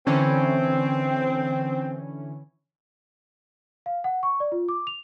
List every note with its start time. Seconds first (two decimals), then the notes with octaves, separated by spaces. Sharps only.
0.07 D3 E3 C4 C#4
3.86 F5
4.04 F#5
4.23 C#6
4.40 D5
4.52 F4
4.69 D6
4.87 F7